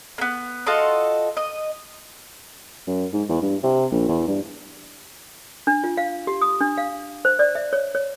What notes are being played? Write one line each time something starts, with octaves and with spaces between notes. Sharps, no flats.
A#3 B3
F4 F#4 A4 D#5
D#5
F#2
G#2
E2
G2
C3
A#1
E2
G2
D4
F4
F5
G4
D#6
D4
F5
C5
D5
E5
C#5
C#5